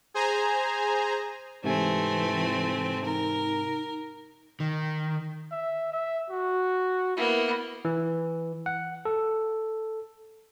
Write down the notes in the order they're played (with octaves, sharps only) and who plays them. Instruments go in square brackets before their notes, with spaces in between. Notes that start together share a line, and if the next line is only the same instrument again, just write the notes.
[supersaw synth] G#4 C5 G#5 A#5
[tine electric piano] G#2 C3 G#5 [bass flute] E3 [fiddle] A3 C4
[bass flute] D#4 [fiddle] A#4
[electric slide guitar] D#3
[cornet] E5
E5
F#4
[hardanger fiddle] A#3 B3 [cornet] E4
[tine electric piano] E3
F#5
A4